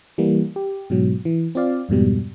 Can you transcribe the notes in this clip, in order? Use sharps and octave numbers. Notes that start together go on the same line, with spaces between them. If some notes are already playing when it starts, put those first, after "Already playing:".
E3 G3 A#3
G4
G#2 B2 F#3
E3
C4 F4 D5 F5
F2 G#2 B2 G3